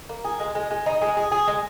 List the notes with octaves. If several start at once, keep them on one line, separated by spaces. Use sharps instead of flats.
A#3
G#4
G#3
G#3
G#3
D#4
G#3
G#4
G#4
G#3